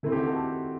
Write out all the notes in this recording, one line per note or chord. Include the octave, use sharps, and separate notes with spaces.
D#3 A3 C4 E4
G4
F#4
A4
G4